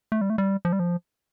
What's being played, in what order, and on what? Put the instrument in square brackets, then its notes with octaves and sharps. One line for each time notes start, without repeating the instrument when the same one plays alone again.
[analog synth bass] A3
G3
A3
G3
F3
G3
F3